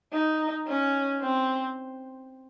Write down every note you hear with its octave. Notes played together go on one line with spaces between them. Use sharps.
D#4
C#4
C4